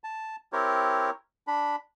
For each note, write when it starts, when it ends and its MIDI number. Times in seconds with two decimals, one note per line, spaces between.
0.04 0.36 81
0.53 1.10 60
0.53 1.10 64
0.53 1.10 67
0.53 1.10 70
0.53 1.10 73
1.47 1.76 62
1.47 1.76 83